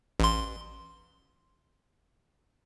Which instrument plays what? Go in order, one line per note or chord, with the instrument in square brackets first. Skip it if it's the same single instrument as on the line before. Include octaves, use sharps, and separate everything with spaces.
[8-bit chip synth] A1 C6